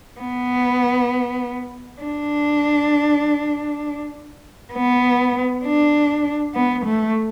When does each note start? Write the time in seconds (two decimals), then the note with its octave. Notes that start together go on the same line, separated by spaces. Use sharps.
0.21 B3
2.02 D4
4.74 B3
5.65 D4
6.55 B3
6.86 A3